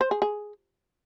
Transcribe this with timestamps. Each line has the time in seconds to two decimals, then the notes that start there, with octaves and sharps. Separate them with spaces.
0.01 C5
0.11 G#4
0.22 G#4